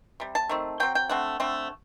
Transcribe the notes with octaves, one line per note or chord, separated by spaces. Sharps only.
C3 G3
A5
D#3 A3 C4
F#3 C4 G5
G5
D3 A3 C4 F#5
D3 A3 C4